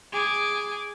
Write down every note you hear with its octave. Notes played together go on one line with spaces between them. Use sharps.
G#4 D6